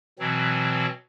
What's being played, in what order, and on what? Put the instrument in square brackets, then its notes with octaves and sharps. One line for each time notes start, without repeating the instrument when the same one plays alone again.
[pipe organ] B2 E3 F#3 C4